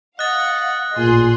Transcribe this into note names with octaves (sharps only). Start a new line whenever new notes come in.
D#5 F5 F#5 F#6 A6
A1 A#2 G#4 C6